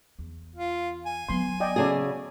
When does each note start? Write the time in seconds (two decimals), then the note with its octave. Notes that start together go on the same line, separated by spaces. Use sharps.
0.19 E2
0.55 F4
1.06 G#5
1.29 F#3 B3 C6
1.60 D5 D#5 G5
1.76 C#3 F#4 G#4 A4 D5